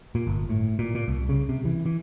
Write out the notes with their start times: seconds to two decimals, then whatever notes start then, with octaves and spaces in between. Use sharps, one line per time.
0.15 A#2
0.27 G1
0.49 A2
0.79 A#2
0.95 A#2
1.08 C2
1.29 C#3
1.49 C3
1.65 E3
1.86 E3